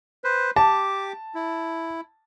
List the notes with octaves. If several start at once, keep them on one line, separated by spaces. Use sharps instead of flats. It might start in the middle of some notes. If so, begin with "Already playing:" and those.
B4 C5
G4 A5 D6
E4